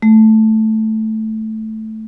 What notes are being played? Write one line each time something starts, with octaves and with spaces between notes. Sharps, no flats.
A3